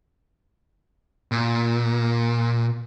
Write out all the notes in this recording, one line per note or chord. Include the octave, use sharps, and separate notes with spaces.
A#2